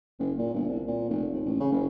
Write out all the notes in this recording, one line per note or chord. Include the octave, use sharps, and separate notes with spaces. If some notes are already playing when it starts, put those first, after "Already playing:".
F#1
A#2
G1
C2
A#2
F1
D#2
A1
C#3
F#1